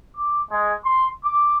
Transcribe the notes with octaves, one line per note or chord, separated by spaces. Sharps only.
D6
G#3
C6
D6